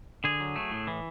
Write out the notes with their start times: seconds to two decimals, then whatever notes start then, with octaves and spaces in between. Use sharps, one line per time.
0.24 D3 G#4
0.40 F#3
0.56 A3
0.71 A2
0.87 E3